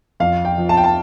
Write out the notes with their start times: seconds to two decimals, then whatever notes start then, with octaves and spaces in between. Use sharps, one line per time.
0.20 F2 F5
0.45 G5
0.58 F3
0.69 A5
0.77 G5
0.84 A5